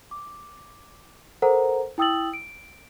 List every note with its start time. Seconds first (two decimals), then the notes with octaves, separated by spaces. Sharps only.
0.11 D6
1.42 A4 A#4 C5 F#5 A#5
1.98 E4 G5 D#6 E6 A6 F#7
2.34 D7